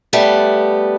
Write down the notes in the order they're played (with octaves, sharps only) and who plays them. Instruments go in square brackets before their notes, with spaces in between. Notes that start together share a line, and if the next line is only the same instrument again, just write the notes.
[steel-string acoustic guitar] G3 A3 B3